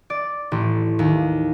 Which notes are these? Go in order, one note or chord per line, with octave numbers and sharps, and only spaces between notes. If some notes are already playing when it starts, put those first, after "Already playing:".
D5
A1
D#2